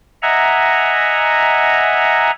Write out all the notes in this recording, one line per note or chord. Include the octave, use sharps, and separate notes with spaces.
D#5 E5 F#5 G#5 A#5